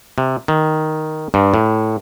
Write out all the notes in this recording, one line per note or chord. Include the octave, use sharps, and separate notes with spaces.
C3
D#3
G2
A2